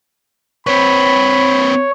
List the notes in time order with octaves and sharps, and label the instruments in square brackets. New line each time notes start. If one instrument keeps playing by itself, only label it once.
[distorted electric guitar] C4 B4 [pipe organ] C#5 [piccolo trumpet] B5